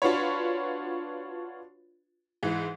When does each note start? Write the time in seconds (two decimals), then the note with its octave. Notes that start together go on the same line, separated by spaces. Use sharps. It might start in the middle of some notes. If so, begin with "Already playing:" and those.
0.02 D4 F4 F#4 B4 C#5
2.43 G#2 E3